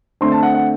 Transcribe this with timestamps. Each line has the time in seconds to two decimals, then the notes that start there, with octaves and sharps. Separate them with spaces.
0.21 D3 A3 C4 C6
0.32 A5
0.43 F#5
0.54 F#5